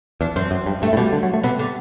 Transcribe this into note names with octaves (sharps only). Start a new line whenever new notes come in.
E2 D4
F#2 C4
F#2
G2
G2 A3
A2
B2 G3
D3
F#3
A3
C3 B3
D3